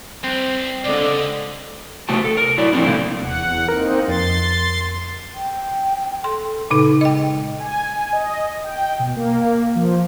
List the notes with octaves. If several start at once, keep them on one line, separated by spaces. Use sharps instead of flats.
C2 C4
C#2 D3 D5 D#5
C3 A3 F#4 G4 A5
A4
A#4
F#3 E4 D5
F3 A3 C4 D4 E4
C3 A3 A#3
D#1 E2 F#5
A#3 C4 D#4 A#4
F2 C6 A6
G5
A4 C6
A#2 C#3 D#4 A4
G#3 D#5 G5
G#5
D#5
G5
B2
A#3
F3